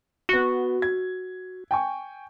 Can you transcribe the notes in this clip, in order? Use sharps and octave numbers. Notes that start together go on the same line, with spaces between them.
B3 F#4 G7
G#6
G5 G#5 C#6